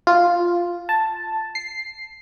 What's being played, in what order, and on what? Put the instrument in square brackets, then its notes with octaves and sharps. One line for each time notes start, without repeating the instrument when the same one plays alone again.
[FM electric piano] F4
A5
C7